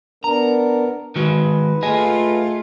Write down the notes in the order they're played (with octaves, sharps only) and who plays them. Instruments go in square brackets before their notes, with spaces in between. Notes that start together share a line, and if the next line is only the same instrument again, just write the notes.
[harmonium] B3 D4 A#4 [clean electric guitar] A#5
[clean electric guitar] D#3 G#3 F#4 [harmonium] B4
[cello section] A3 F4 [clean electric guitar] G#4 D#5 G#5